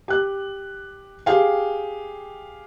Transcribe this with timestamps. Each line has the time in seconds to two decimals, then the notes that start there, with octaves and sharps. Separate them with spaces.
0.08 G4 F#6
1.26 G4 G#4 F5 G5